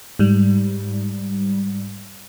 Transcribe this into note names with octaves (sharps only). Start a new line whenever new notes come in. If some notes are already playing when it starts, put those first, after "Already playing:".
G#2 G3